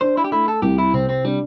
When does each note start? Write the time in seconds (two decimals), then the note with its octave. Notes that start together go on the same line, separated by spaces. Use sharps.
0.01 D4 C5
0.17 E4
0.24 G4
0.32 A3 E4
0.48 A4
0.62 C2 G4
0.78 E4
0.93 C3 C4
1.09 C4
1.24 G3 D4